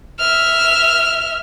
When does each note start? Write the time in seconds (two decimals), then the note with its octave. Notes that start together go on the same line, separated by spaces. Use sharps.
0.19 E5 F6